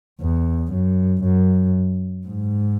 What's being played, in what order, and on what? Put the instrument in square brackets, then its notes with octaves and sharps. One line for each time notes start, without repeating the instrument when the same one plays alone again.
[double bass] E2
F#2
F#2
G#2